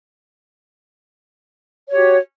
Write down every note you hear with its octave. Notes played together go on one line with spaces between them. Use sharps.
F#4 G4 C#5